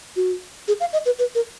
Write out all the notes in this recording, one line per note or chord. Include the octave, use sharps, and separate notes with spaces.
F#4
G#4
F5
D#5
B4
B4
A#4